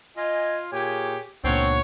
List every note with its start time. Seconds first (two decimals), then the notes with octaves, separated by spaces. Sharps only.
0.17 F4 D#5 G#5
0.73 A#2 G4 G#4 C#5 G#5
1.44 C#2 A#2 B3 C4 D4 C#5 F#5